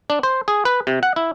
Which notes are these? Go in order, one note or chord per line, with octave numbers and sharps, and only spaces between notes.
D4
C5
G#4
B4
C3
F#5
E4